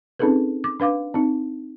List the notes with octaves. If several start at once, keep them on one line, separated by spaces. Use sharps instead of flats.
C4 C#4 D#4 G#4 A4 B4
D6
D4 B4 F5 D6
C4 D#4